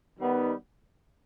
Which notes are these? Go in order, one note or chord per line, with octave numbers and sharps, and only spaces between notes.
D#3 G3 B3 D#4